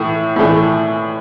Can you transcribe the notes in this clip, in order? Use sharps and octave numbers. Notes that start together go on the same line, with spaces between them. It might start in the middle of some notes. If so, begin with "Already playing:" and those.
Already playing: A2 E3 A3
A2 E3 A3